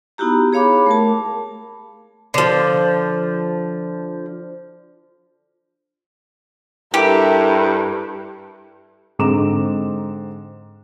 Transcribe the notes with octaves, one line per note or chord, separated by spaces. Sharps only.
B3 D#4 E4 F#4 G4 A#5
G#4 C#5 F5 B5 D6
A3 A#4 A5
D3 F3
G2 E4 G4 A4 A#4 E5
G#2 D3 C4 A#5 D6 E7